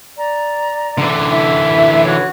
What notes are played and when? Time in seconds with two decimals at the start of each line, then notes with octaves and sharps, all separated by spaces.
0.16 D5 A#5
0.98 D3 E3
1.31 E4 E5
2.05 F#4 C#5 F#6